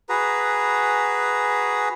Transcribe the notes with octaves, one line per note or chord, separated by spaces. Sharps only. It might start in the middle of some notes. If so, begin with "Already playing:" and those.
F#4 G#4 B4 A#5